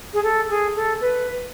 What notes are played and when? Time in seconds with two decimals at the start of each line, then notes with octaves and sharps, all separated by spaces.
0.14 G#4
0.23 A4
0.50 G#4
0.76 A4
1.01 B4